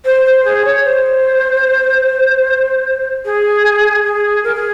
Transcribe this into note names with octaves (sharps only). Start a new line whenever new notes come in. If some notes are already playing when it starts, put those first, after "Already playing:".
C5
C5
G#4
C#5
C5
G#4
G#4
A#4
G#4